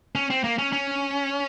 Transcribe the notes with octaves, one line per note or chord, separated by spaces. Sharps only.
C#4
C4
A#3
C#4
C#4